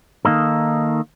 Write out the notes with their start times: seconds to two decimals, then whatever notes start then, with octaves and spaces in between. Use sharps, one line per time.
0.25 D#3 A#3 D#4 A4